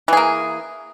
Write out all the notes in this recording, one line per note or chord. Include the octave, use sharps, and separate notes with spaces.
E3 A#3 G#4